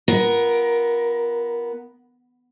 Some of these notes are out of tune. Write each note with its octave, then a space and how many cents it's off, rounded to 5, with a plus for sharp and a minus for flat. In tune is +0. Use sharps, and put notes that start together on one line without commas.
B3 +0 F4 -15 A#4 +15